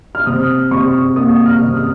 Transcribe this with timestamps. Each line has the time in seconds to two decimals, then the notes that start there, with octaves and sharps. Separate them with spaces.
0.15 F6
0.26 C3 D#6
0.71 C3 C#6
1.16 A#3 D#6
1.46 F6
1.61 C3
1.76 D#6